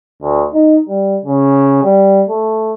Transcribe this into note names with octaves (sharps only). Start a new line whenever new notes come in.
D2
D#4
G3
C#3
G3
A3